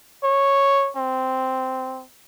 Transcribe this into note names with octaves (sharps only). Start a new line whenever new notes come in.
C#5
C4